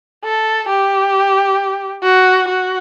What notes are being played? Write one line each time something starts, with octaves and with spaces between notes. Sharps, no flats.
A4
G4
F#4
F#4